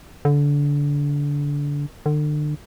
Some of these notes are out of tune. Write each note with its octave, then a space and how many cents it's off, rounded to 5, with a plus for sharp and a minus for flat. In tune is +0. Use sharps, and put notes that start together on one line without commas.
D3 -25
D3 +35